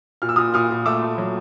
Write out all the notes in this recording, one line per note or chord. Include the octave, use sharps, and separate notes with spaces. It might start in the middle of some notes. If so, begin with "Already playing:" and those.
A#2 F6
E6
A#2 D#6 F6
A#2 D#6 F6
A#2
A3 D6 E6
A3
F#3